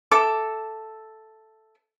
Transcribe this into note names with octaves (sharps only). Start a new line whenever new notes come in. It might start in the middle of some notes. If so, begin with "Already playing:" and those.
A4 E5 D6